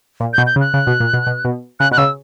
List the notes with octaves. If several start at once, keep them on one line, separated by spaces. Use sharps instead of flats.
A#2
G6
B2
G6
C#3
F#6
C#3
B2
A#2
B2
B2
B2
C#3 F#6
B2 F#6
C#3 E6